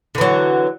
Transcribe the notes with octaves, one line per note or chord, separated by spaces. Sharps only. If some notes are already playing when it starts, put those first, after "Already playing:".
D3 E3 F#3